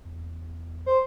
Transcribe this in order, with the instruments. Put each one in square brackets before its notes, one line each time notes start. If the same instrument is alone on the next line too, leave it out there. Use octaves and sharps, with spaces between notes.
[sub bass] E2
[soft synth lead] C5